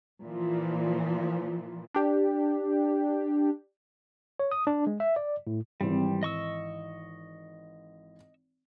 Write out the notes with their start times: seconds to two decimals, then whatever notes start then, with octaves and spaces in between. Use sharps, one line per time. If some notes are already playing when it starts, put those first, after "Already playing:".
0.23 A#2 E3 F3
1.94 D4 G4
4.40 C#5
4.51 D#6
4.67 D4
4.87 G#3
5.00 E5
5.16 D5
5.47 A2
5.81 G#1 E3 G3 C4
6.23 D#5 C#6 E6